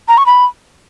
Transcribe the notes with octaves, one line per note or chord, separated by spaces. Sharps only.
A#5
C#6
B5